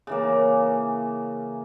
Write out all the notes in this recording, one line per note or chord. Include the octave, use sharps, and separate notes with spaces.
C#3 E3 A#3